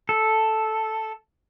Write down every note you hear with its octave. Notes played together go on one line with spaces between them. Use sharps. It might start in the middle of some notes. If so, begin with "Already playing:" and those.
A4